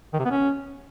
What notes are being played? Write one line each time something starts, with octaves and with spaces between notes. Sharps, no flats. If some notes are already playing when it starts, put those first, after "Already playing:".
D#3
C3
B3
C#4